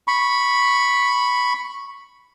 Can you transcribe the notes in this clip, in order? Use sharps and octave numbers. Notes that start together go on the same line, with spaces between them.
B5 C#6